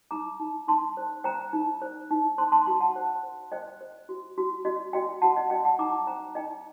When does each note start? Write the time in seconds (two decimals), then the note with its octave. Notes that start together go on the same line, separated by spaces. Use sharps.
0.11 D#4 A#5 D6
0.40 D#4
0.68 D#4 A5 C6
0.97 C5
1.24 C5 G5 A#5
1.53 D#4
1.81 C5
2.11 D#4
2.38 C5 A5 C6
2.52 A5 C6
2.66 F#4 A5 C6
2.80 F#5 A5
2.96 C5
3.23 C5
3.52 C5 D#5 G5
3.81 C5
4.09 F#4
4.38 F#4
4.65 F#4 D#5
4.93 F#4 D#5 G5
5.22 F#4 F#5 A5
5.37 D#5
5.50 F#4 D#5 G5
5.65 F#5 A5
5.79 D#4 A#5 D6
6.07 C5 G5 A#5
6.35 D#4 D#5 G5